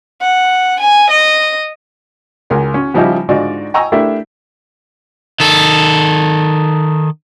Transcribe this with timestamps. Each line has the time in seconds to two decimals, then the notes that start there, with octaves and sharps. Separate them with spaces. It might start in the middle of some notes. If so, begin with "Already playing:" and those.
0.21 F#5
0.80 G#5
1.10 D#5
2.50 C#2 A#4 G#5
2.74 C#4
2.94 C#3 F3 G3 D#4 E4 G4
3.29 G#2 D3 D#4 F4 F#4 D5
3.74 D#5 G5 G#5 A#5 C#6 E6
3.92 A3 D4 E4 G4 A#4 E5
5.40 D#3 A4